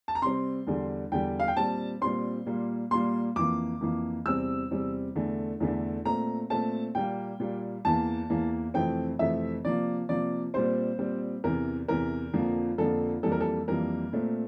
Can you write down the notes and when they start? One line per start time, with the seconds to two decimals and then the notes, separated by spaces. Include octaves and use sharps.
0.08 A5
0.15 A#5
0.22 C3 G3 C4 C6
0.67 E2 D3 G3
1.12 E2 D3 G3 G5
1.40 F5
1.48 G5
1.57 A#2 G3 C4 A5
2.01 A#2 G3 C4 C6
2.46 A#2 G3 A#3
2.91 A#2 G3 A#3 C6
3.36 F2 E3 A#3 D6
3.81 F2 E3 A#3
4.26 E2 C3 G3 C4 E6
4.71 E2 C3 G3 C4
5.16 E2 D3 A3
5.60 E2 D3 A3
6.05 A#2 A3 C4 A#5
6.50 A#2 A3 C4 A5
6.95 A#2 G3 A#3 G5
7.40 A#2 G3 A#3
7.85 E2 E3 A#3 A5
8.30 E2 E3 A#3
8.74 F2 C3 E3 A3 C4 G5
9.19 F2 C3 E3 A3 C4 E5
9.64 C3 F3 A#3 D5
10.09 C3 F3 A#3 D5
10.54 A#2 G3 C4 C5
10.99 A#2 G3 C4
11.44 E2 C3 E3 A#4
11.88 E2 C3 E3 A#4
12.34 F2 D3 F3 A#3
12.78 F2 D3 F3 A#3 A4
13.23 F2 E3 G3 A#3 A4
13.32 A#4
13.40 A4
13.68 F2 E3 G3 A#3 A#4
14.13 A#2 A3 C4